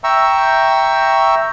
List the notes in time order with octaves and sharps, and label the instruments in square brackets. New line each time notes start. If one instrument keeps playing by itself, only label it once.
[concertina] E5 G5 A#5 C#6 E6